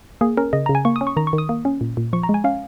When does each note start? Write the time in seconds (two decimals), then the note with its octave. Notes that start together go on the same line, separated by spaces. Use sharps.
0.21 A#3 G#4
0.37 C#4 A#4
0.53 C#3 D#5
0.66 A#5
0.69 C#3
0.75 G#5
0.85 A#3 C#6
0.96 D#6
1.01 C#4
1.07 C#6
1.17 D#3 A#5
1.27 C#6
1.33 D#3
1.38 D#6
1.49 A#3
1.65 C#4
1.81 A#2
1.97 A#2
2.13 F3 C#6
2.23 A#5
2.29 G#3
2.34 G#5
2.44 C#4 F5